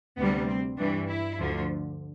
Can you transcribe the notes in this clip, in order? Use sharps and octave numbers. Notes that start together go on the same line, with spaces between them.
D2 C3 G3 B3
C4
G2 E3 G3 D4
E4
D2 D3 F3